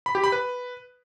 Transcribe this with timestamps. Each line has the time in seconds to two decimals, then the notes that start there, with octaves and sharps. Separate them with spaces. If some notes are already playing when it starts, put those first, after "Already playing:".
0.06 B5
0.15 G4
0.24 B5
0.32 B4